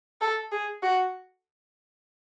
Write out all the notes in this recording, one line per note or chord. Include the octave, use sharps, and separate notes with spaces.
A4
G#4
F#4